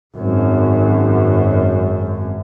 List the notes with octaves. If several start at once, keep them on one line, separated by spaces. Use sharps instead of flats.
G#1 F#2